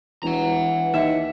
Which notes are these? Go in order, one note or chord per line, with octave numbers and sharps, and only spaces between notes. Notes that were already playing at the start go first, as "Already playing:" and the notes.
E1 E3 F#5 A#5
D#2 E5 C#7